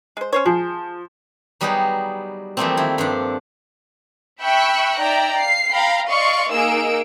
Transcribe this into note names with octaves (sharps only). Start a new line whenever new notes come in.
G#3 C5
C#4 C5 C#5
F3 G#4
F#3 G3 B3 D#4 G4 G#4
E3 F3 G3 A3 A#3 C4
D#3 E4 F4
G2 F3 D4
E5 G5 B5 C#6 E6 F#6
D#4 D5 E5 G5 A#5
F5 C7
F5 G5 A#5 B5
D5 D#5 F5 C6 C#6
A#3 D#4 G#4 E6 D7